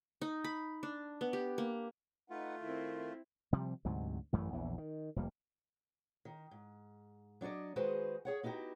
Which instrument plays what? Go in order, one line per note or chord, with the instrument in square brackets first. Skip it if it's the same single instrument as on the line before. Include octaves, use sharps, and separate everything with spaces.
[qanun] D#4
B5
D4
B3
G4
A#3
[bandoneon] A3 F4 [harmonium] D#4 B4 F#5
[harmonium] D#3 [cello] C4 E4
[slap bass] C3 F3 G3
D2 G#2 C3 F#3
A1 F#2 E3 A3
A#1 E2 E3
D#3
F1 F2 G3 A#3
[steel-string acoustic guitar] D#3
G#2
F#3 D4 F#4 D5 D#5
D#3 G#3 F#4 G#4 B4 C5
G#4 C#5 F#5
B3 D#4 E4 F#4 G4